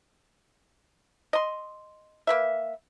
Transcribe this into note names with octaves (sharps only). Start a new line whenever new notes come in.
D#5 C6
A#3 B4 E5